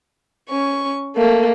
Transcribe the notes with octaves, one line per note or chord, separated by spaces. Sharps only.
C#4 C#6
A3 A#3